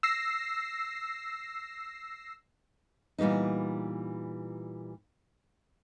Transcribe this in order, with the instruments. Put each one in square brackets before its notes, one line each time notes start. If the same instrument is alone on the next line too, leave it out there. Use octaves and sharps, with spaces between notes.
[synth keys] E6 A#6 C7
[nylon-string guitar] A#2 E3 G3 B3 D#4